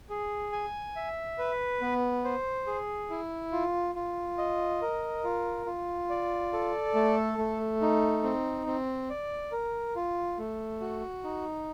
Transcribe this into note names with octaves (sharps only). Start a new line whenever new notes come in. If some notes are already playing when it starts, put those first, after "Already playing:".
G#4
G#5
E5
B4
B3
C5
G#4
E4
F4
F4
D#5
A#4
F4
F4
D5
A4
A3
A3
D#4
C4
C4
D5
A#4
F4
A3
F#4
D#4